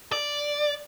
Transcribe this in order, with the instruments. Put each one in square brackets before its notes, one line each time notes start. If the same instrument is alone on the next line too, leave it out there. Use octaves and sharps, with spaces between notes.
[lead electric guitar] D5